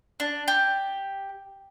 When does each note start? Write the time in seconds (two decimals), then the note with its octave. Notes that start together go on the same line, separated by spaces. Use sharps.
0.20 D4
0.48 G4